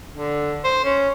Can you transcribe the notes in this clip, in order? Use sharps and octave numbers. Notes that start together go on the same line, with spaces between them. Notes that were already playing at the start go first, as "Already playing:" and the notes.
D3
C5
C#4